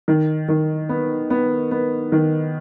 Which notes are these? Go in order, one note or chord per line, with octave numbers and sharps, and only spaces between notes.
D#3
D#3
B3
B3
B3
D#3